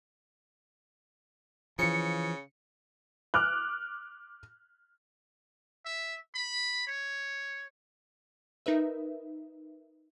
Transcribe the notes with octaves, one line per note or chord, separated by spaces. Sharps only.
C#3 E3 F3 C#7
D6 F6 F#6
E5
B5
C#5
D#4 A#4 B4 E5